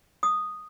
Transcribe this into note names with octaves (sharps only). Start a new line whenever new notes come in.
D#6